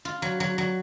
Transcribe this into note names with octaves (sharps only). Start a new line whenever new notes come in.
F4
F#3
F#3
F#3